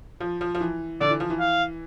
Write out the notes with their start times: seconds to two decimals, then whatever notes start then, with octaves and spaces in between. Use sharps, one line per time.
0.20 F3
0.41 F3
0.55 F3
0.61 E3
1.01 D3 D5
1.10 E3
1.20 F3
1.30 E3
1.40 F5